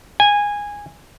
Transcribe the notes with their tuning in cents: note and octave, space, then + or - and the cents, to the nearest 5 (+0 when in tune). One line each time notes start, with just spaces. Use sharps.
G#5 -15